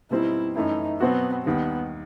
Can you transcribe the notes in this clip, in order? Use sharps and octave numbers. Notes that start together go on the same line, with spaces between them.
B2 G3 C4 D#4 E4
F#2 E3 A3 D#4 E4
B2 F#3 B3 C4 F#4
D#2 D#3 G3 B3